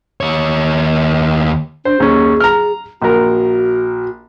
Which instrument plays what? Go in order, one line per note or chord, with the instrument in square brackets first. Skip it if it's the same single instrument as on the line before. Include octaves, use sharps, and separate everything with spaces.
[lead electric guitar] D#2 C#5
[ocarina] D4 [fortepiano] C5
[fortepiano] D#2 C#4 [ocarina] G#4
[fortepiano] A#5 F6
[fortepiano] A#1 A#4 [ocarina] F#4